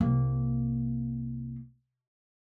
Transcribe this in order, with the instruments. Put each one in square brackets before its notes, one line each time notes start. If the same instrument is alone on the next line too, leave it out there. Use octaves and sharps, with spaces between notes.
[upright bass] C2 A#3